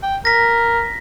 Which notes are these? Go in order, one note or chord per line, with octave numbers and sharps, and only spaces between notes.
G5
A#4 A#6 B6